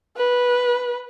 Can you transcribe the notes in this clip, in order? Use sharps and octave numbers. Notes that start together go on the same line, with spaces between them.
B4